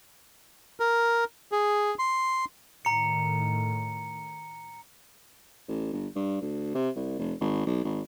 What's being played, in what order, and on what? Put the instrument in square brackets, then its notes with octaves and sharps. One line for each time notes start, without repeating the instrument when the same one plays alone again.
[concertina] A#4
G#4
C6
[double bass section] A2 D#3 [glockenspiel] A#5 C#7
[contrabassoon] A1
G1
G2
D2
C3
C2
F1
G#1
B1
G#1